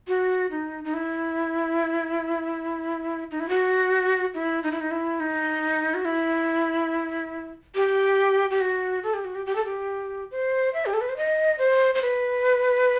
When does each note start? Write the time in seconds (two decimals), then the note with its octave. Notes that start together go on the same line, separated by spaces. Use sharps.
0.08 F#4
0.51 D#4
0.84 D#4
0.94 E4
3.31 D#4
3.40 E4
3.49 F#4
4.35 E4
4.63 D#4
4.72 E4
4.80 D#4
4.91 E4
5.20 D#4
5.94 F#4
6.05 E4
7.75 G4
8.50 G4
8.61 F#4
9.03 A4
9.14 G4
9.25 F#4
9.35 G4
9.46 G4
9.56 A4
9.65 G4
10.31 C5
10.74 E5
10.86 G4
10.94 A4
11.01 B4
11.09 C5
11.17 D#5
11.59 C5
11.95 C5
12.02 B4